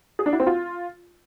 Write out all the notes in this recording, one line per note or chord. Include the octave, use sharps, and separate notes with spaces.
G#4
D4
E4
C4
F4